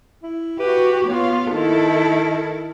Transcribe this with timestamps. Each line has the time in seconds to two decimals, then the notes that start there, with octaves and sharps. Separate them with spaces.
0.23 E4
0.59 F#4 G4 B4
1.08 B3 F4 C#5
1.53 D#3 E4 A4